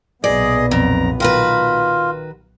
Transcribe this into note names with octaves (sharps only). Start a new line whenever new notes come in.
B1 A#2 B3 G#4 D5 D#5
F2 A#5
D#3 F4 F#4 B4